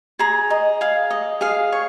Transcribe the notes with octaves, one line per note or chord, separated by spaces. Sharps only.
G#4 A#5
D#5
G#4 F5
D#5
G#4 F5
C#5